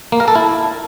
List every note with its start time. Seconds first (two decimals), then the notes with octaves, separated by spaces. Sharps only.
0.12 A#3
0.20 A#4
0.28 A4
0.35 E4